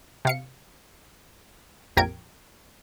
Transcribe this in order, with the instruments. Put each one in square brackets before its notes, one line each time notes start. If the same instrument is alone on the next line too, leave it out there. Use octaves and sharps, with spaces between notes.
[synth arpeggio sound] C3 F5 C#7
A#1 F2 G4 A#4 G#6 D7